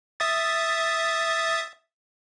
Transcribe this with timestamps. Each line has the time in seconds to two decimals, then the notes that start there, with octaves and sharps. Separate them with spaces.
0.20 E5 D#6 A6